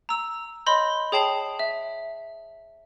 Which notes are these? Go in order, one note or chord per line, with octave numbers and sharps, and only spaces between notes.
A#5 E6
C#5 D#5 B5 C6 G6
G#4 C#5 G5 A5 C7 F#7
E5